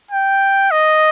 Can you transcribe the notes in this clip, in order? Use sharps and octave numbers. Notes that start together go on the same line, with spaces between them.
G5
D#5